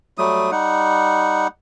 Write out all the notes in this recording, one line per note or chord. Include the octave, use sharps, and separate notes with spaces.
F#3 G3 A3 D#6
G3 D#4 F#5